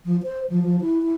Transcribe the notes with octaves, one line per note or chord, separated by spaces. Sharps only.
F3
C5
F3
F3
E4
E4